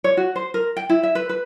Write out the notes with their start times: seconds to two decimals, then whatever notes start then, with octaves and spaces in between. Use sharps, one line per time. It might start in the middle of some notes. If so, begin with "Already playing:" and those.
0.04 C#5
0.17 F#4
0.36 C5
0.54 A#4
0.77 G5
0.89 E4
1.03 E5
1.15 B4
1.29 B4